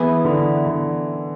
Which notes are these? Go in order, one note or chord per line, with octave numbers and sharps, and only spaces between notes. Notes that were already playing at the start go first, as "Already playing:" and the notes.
Already playing: E3 B3 E4 G#4
D3
D3